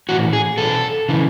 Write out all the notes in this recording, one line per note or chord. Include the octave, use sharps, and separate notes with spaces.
A2 E3 F#4
G#4
E2 B2 A4
C#3 E3